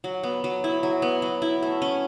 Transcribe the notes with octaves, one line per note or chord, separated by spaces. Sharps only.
F#3
B3
F#3
E4
F#3
B3
F#3
E4
A3
C#4